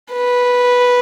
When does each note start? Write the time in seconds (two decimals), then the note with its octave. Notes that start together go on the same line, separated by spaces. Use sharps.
0.13 B4